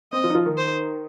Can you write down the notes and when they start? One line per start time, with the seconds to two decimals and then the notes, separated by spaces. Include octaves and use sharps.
0.13 C4 D#5
0.24 F3 F4
0.30 D#4
0.35 F3 F4
0.46 D#3 D#4
0.57 C5